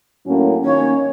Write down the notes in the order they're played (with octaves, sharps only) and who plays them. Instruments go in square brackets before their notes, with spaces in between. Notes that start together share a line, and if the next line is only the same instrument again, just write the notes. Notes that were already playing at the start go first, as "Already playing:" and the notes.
[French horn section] A2 F#3 A#3 C#4
[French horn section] D#3 A#3 C#4 [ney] C#5